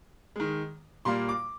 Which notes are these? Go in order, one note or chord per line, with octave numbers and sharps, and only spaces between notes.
D#3 G#3
A#2 G3 A#3 C6
D6